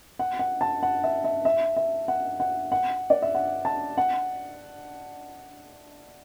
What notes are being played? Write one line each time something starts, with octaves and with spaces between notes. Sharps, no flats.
F#5
F#5
A5
F#5
E5
E5
E5
E5
F#5
F#5
F#5
D5
E5
F#5
A5
F#5